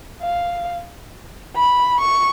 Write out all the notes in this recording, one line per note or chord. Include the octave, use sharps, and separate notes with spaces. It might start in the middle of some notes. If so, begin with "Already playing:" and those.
F5
B5
C#6